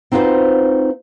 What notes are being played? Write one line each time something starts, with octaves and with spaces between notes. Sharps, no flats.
C4 D#4 F4 F#4 B4 C5